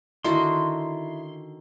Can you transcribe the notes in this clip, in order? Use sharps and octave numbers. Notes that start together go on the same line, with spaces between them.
D3 D#3 E4 F#4 C6